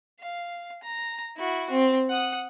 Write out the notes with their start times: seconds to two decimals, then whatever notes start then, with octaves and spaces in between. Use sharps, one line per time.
0.20 F5
0.83 A#5
1.37 E4 F#4
1.70 C4
2.10 F#5 D#6